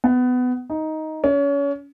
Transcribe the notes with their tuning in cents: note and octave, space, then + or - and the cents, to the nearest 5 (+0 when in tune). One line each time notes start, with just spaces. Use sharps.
B3 +20
D#4 +10
C#4 +30